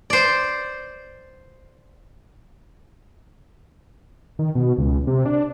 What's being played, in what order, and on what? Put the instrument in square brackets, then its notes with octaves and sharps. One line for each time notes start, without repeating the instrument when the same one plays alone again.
[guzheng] C5 D5
[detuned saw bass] D#3
B2
C#2
C3
D4